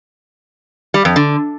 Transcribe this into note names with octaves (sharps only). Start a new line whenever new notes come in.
G3
F2
D3